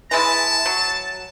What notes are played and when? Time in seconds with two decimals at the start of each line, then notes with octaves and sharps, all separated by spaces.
0.11 E3 G#3 E4 A5
0.66 F#3